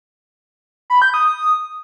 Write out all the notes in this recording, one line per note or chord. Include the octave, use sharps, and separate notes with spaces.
B5
G6
D#6